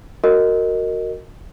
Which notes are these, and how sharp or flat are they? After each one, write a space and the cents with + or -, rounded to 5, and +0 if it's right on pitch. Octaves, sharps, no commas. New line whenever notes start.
F#4 +0 A#4 -20 D#5 +0